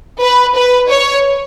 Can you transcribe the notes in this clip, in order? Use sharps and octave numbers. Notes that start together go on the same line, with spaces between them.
B4
B4
C#5